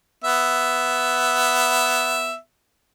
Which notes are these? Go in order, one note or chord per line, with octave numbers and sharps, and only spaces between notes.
B3 E5